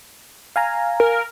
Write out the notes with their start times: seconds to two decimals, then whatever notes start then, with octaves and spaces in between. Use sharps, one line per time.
0.56 F5 G#5 A#5
1.00 A#4